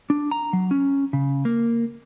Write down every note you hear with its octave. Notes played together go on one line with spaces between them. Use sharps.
D4
A#5
F#3
C#4
C#3
A#3